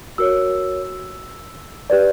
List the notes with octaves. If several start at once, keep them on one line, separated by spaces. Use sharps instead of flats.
F#4 A#4 C#5 E6
G4 B4 D5